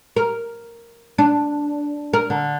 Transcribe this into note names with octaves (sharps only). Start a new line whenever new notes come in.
A#4
D4
A#4
D3